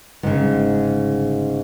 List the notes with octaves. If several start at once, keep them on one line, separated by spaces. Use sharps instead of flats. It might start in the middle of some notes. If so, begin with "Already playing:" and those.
G1 G#2 C#3